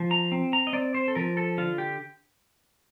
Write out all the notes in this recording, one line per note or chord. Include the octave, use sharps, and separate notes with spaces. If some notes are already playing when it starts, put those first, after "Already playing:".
Already playing: F3
A#5
C4
A#5
D#5
C4 D5
C5
A4
F3 A#4
A4
D3 F4
G4